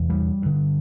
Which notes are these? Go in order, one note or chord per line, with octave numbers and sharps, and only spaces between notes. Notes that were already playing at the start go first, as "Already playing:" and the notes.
Already playing: E2 C3
G3
G2 D3